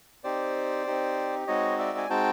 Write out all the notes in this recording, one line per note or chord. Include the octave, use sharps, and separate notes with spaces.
C4 D#4 G4 C5 D5
C4 D#4 G4
G#3 C4 D#4 F#4 C#5 D#5
D5 E5
G#5
G#3 C4 D#4 F#4 G5 A5